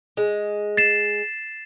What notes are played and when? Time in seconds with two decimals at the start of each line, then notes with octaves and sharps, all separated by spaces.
0.17 G#3
0.77 A6 C7 E7